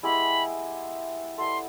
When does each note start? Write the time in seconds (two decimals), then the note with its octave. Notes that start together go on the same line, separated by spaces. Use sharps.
0.03 G#3 B3 E4 G4 B5
1.37 G3 B3 E4 A4 C6